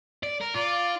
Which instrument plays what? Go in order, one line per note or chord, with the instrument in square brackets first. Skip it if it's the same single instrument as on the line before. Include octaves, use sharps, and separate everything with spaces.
[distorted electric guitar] D5
A#4
[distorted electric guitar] F4 [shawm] D5